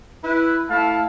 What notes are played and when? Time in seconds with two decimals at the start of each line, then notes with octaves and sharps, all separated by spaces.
0.24 E4 B4
0.70 A3 E4 F5 A5